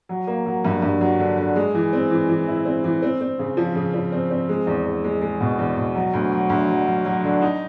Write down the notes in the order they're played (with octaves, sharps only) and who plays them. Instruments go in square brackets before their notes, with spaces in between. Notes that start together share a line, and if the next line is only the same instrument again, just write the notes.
[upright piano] F#3
A#3
F#3
G2
G2
F#3
D3
D3
G#3
E3
C4
E3
E3
E4
C4
E3
C4
C4
C#3
F3
C#3
F3
C4
C4
G#3
E2
E2
G#3
G#3
B2
E2
B2
F#3
D2
F#3
D2
F#3
F#3
F#3
D3
D#4